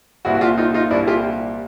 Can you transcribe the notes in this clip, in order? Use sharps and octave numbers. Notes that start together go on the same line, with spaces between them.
C2 A#2 G3 A#3 E4 F#4
F#4
F4 G4
D#4 F4
D#4 F4
C2 A#2 G3 A#3 D4 E4
F4 G4